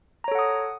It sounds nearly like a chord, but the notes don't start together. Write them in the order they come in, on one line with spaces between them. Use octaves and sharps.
A#5 C#5 A4 F#5 D#6